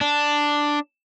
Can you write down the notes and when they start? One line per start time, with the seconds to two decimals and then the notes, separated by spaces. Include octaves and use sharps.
0.01 D4